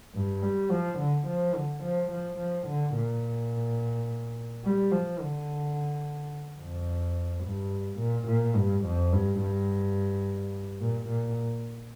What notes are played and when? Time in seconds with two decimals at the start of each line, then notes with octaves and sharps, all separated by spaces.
0.14 G2
0.43 G3
0.71 F3
0.99 D3
1.28 F3
1.55 D3
1.84 F3
2.11 F3
2.39 F3
2.67 D3
2.96 A#2
4.64 G3
4.92 F3
5.20 D3
6.60 F2
7.44 G2
7.99 A#2
8.27 A#2
8.56 G2
8.85 F2
9.13 G2
9.40 G2
10.81 A#2
11.08 A#2